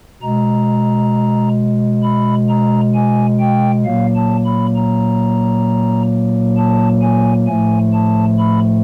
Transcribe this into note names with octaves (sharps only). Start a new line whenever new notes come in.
B2 G#3 A#5
B5
A#5
G#5
G5
A#2 F#3 A#3 F5
A5
B5
A#5
A5
G#5
A2 F3 A3 G#5
A5
B5